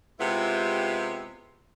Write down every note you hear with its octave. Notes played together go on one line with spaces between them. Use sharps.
C3 G#3 B3 E4 F4 G4